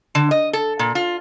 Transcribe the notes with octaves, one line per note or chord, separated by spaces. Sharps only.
D3
D#5
A4
A#2
F4